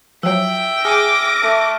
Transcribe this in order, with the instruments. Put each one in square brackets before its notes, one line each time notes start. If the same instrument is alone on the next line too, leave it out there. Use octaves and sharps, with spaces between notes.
[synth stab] F3 F#3 [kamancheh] E5 G5 [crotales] E6
[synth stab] G#4 G#5 [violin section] D6 A#6 [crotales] F6 D#7
[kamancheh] A3